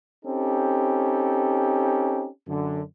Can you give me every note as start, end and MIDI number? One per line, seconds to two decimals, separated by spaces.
0.25 2.26 60
0.25 2.26 61
0.25 2.26 63
0.25 2.26 67
0.25 2.26 69
2.47 2.81 42
2.47 2.81 50